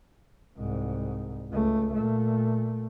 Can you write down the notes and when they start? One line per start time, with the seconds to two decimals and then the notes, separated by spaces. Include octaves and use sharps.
0.57 C2 G#2
1.51 C#2 A3
1.94 A#2 A3